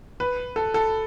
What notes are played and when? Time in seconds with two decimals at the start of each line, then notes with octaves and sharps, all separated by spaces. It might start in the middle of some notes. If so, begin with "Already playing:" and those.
0.20 B4
0.56 A4
0.74 A4